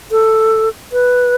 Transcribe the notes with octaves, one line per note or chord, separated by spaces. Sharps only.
A4
B4